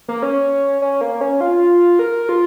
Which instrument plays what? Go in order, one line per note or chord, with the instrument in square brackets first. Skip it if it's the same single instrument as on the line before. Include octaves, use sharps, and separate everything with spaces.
[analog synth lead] A#3
C#4
C#4
A#3
C#4
F4
A#4
F4